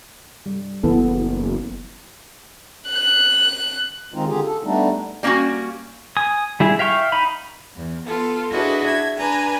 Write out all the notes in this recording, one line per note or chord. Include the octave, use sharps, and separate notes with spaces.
G3
F#1 E3 B3 A4
F#6
D#3 G#3 C4 D#4 F4
D3 F4 G4 G#4
A4
G3 A3 B3 D4 D#4
G3 A#3 C#4 E4 F#4
G#5 D#6
G3 E4 G#4
E5 F5 G5 C#6 F6
D#4 B5
E2
B3 F4 A4
D4 E4 F#4 G#4 B4 D#5
E5 G#6
D4 B4 G#5 A#5